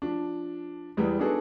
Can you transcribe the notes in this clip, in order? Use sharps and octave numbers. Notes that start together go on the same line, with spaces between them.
F3 D4
E2 E3 G3 G#3
B3 D4 D#4 F#4 G#4 A4